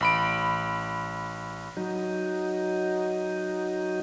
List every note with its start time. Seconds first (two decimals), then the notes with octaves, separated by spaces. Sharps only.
0.01 A1 B5 D7
1.77 F#3 D#4